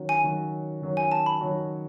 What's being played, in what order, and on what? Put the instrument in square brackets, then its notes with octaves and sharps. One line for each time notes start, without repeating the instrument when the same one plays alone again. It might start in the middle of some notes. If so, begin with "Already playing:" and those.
Already playing: [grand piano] D#3 F#3 C#4 F#4
[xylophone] G#5
[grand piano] D#3 F#3 C#4 F#4
D#3 F#3 C#4 F#4
[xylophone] G#5
A5
B5
[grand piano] D#3 F#3 C#4 F#4